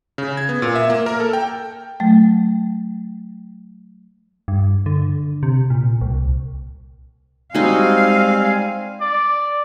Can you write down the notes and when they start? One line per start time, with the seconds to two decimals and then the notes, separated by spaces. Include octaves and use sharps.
0.18 C#3
0.37 G#6
0.49 B3
0.62 A#2
0.76 E5
0.90 A#3
1.06 A#4
1.20 A4
1.33 G5
2.00 F#3 A3 G5
4.48 G2
4.86 D3
5.43 C3
5.70 A#2
6.01 C2
7.55 G3 G#3 C4 D#4 F#4 F5 G#5
9.01 D5